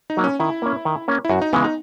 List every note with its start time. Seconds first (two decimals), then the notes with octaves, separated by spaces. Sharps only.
0.10 D#4
0.17 F#3 A#3
0.24 C#4
0.40 D#3 E4
0.62 A#3 C#4
0.85 D#3
1.08 A#3 C#4
1.25 E4
1.29 F#2 F#4
1.42 D#4
1.53 C#3 E3 G#3 B3
1.64 D#4